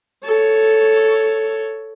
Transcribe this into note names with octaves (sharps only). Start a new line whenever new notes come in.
A4 C#5